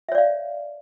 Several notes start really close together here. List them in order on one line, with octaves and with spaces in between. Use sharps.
E5 C#5 D5 F5